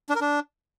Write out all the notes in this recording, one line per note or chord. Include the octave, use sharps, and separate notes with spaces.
D4
A#4
D4